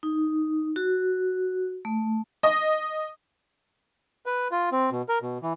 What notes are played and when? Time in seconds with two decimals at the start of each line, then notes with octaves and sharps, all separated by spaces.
0.03 D#4
0.76 F#4
1.85 A3
2.43 D#5
4.26 B4
4.52 F4
4.72 C4
4.91 B2
5.09 A#4
5.22 B2
5.43 E3